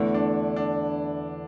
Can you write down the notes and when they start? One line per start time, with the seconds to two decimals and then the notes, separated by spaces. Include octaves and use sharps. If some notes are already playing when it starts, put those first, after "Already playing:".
Already playing: E2 D3 A3 E4
0.14 D4
0.56 D4